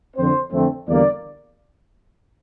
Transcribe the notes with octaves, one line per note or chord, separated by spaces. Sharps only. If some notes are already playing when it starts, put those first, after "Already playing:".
F2 D3 F3 C4 C5
F2 D3 F3 A3 C4
E2 D3 G3 A#3 D5